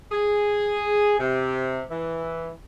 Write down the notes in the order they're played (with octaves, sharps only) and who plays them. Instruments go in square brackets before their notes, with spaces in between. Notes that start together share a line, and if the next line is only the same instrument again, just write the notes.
[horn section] G#4
C3
E3